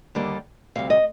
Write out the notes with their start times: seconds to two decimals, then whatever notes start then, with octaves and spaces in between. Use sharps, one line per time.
0.15 D#2 D3 G3 A#3 D4
0.75 D2 C3 G3 F5
0.90 D#5